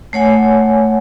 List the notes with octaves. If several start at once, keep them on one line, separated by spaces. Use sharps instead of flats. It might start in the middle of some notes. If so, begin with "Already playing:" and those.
A3 C#5 F#5 G#5